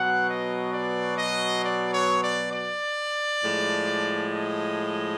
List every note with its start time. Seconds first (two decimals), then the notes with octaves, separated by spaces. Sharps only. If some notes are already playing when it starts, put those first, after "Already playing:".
Already playing: B2 F#3 B3 F#5
0.28 D#5
0.72 D5
1.17 D#5
1.63 D5
1.92 C#5
2.23 D5
2.52 D5
3.43 A2 F3 G#3
4.33 D#5